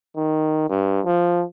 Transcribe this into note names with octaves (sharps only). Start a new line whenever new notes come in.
D#3
G2
F3